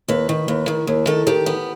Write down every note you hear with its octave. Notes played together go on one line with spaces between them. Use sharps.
D#2 B4
D#3
D#2
D#3
D#2
D#3 A4
D#3 G4
B3